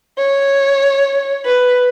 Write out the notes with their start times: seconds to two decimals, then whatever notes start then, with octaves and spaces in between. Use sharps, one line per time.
0.18 C#5
1.45 B4